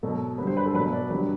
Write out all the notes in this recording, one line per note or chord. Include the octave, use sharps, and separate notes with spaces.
B2 F#3 A4
G2 D3 F#3 B4
C5
B4
A4
B2 F#3 B4
D5
G2 D3 F#3 B4